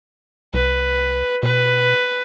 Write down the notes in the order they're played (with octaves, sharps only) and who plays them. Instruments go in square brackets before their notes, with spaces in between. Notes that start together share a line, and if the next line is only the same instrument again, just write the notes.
[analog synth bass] C2 [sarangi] B4
[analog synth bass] B2 [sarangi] B4